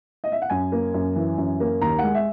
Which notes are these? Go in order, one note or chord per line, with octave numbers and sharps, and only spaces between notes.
D#5
E5
F#5
F#2 G#5
A#3
F#2
E3
F#2
A#3
D#2 A#5
G#3 F#5
E5